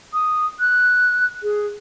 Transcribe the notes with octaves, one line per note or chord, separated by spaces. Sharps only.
D#6
F#6
G#4